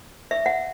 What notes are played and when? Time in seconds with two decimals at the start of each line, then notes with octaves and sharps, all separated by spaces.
0.31 E5
0.46 F#5